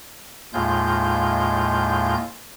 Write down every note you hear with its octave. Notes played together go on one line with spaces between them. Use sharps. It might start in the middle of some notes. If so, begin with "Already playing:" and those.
D#2 A2 G#3 F4 G6